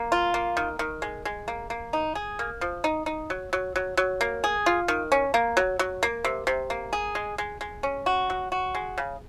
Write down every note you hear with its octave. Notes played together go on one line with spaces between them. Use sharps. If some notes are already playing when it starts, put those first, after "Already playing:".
Already playing: A#3
F4
A#3
D#3
D#3
G#3
G#3
A#3
A#3
D#4
G#4
A#3
F3
D#4
D#4
F#3
F#3
F#3
F#3
A#3
G#4
F4
D#3
C#4
A#3
F#3
F#3
A#3
C3
C3
A#3
G#4
G#3
G#3
G#3
C#4
F#4
F#3
F#4
G#3
C#3